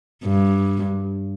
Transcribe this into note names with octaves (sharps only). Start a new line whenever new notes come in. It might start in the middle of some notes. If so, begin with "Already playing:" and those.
G2